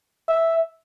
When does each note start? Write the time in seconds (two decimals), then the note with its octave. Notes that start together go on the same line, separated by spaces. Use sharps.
0.29 E5